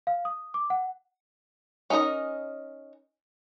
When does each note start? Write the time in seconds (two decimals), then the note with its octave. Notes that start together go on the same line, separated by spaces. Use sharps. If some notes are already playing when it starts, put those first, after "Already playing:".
0.07 F5
0.25 D#6
0.54 D6
0.70 F#5
1.90 C#4 D#4 G#4 A#4 D#5